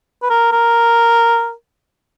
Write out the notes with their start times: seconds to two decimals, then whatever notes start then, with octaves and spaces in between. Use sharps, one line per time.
0.22 B4
0.30 A#4
0.52 A#4